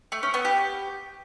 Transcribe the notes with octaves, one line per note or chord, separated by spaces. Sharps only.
A3
C#4
B3
G4